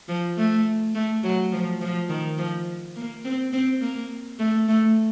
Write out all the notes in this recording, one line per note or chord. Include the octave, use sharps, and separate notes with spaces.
F3
A3
A3
F#3
F3
F3
D#3
F3
A#3
C4
C4
A#3
A3
A3